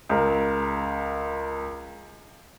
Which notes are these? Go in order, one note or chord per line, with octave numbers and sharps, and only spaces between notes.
C#2 A#4